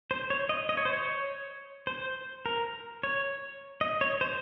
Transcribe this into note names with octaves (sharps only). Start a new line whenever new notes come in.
C5
C#5
D#5
D#5
C#5
C5
C#5
C5
A#4
C#5
D#5
C#5
C5